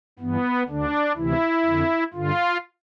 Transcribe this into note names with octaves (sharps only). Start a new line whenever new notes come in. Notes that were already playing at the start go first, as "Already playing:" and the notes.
G2 E3 B3
D2 D3 D4
D2 C3 E3 E4
F2 D3
G2 D3 F4